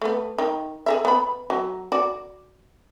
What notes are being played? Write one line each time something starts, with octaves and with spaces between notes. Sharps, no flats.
A3 B3
D#3
G#4 A#4 E5
B3 B5
F#3
F#4 D5